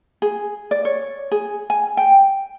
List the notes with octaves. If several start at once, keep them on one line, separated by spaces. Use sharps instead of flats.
G#4
D5
C#5
G#4
G#5
G5